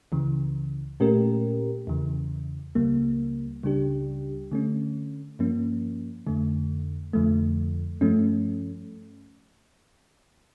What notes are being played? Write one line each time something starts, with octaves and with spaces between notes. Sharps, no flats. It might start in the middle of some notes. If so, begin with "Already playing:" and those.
C#2 C#3 E3
A#2 A3 C#4 G4 A#4
E2 C#3 E3
C#2 C#3 G3 A#3
C#2 C#3 G3 D4 G4
D3 A3 C#4
G2 F3 A#3 C#4
F2 D3 A3
F2 D3 F3 A3
G2 F3 A3 C#4